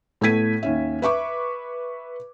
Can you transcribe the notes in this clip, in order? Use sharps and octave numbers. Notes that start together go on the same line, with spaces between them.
A2 A3 B3 G#6 B6 D#7
D#2 C#4 E5
B4 E5 C#6 D6